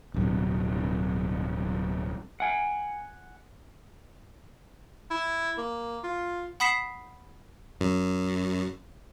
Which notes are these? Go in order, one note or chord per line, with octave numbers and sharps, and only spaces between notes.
D1 B1 G2
F#5 G#5
E4
A#3
F4
F#5 B5 D#6 B6 C7 E7
F#2